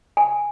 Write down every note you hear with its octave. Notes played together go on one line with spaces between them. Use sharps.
G#5